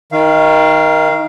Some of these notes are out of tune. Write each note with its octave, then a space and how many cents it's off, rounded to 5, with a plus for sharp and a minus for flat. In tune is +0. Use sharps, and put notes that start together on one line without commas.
D#3 +15 F5 -20